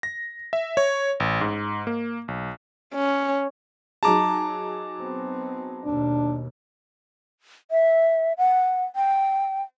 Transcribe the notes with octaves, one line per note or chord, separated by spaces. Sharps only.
A#6
E5
C#5
A1
G#2
A#3
B1
C#4
F#3 D#4 G#4 A5 A#5 D6
B3 C4
D#2 B2 D4
E5
F#5
G5